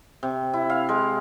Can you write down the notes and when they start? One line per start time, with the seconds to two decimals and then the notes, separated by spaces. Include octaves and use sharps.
0.23 C3
0.53 E4
0.70 F5
0.89 G#3